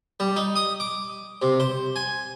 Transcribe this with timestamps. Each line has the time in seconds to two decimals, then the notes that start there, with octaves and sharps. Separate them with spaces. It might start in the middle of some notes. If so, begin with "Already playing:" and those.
0.20 G3
0.36 D#4
0.56 D#6
0.80 D6
1.42 C3
1.60 C5
1.96 G#5